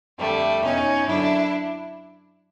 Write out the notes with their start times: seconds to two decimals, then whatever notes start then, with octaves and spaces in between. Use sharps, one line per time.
0.19 F2 D3 G3 A3
0.63 E2 B2 C#4 D#4
1.06 F#2 D3 D4 E4